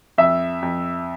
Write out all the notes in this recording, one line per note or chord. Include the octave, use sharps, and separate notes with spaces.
F2 E5
F2